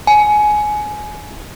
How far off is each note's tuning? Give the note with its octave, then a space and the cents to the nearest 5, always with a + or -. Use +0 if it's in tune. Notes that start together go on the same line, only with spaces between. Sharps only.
G#5 +20